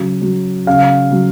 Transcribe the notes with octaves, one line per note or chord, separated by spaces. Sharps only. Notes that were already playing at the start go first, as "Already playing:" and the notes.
Already playing: C#3 F#3
F#3
C#3 F5
F#3